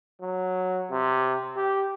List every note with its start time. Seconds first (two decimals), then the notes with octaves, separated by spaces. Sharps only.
0.22 F#3
0.91 C3
1.57 G4